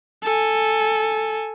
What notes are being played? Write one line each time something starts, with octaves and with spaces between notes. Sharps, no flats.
A4 G#5